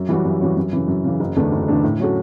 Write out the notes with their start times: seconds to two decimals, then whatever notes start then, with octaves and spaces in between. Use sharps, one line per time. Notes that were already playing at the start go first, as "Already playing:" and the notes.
Already playing: F#2
0.09 E3 G3 C#4 F#4
0.25 F#2
0.41 E3 G3 C#4 F#4
0.57 F#2
0.73 C#3 E3
0.88 F#2
1.04 C#3 E3
1.20 F#1
1.36 E2 D3 A3 D4
1.52 F#1
1.68 E2 D3 A3 D4
1.83 A2
2.00 F#3 C#4 F#4 A4